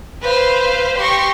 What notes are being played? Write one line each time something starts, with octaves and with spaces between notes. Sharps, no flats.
B4 C5 F5
G4 C6 C#6 A#6